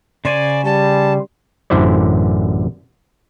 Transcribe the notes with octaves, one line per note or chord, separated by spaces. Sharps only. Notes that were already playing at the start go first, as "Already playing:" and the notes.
C#3 C5 D5 G#5
G3 A5
A1 F#2 D3 E4 C5 D5